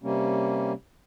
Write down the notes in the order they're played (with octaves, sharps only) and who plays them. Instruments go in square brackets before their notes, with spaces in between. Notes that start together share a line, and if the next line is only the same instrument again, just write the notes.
[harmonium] C3 G3 A#3 C#4